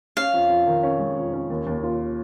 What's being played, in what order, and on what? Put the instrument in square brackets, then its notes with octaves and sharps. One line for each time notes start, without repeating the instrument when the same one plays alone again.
[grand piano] C#4 [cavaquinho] F5
[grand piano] F2
F2
D#3
C#4
G#3
F2
C#4
D#2
D#2
F4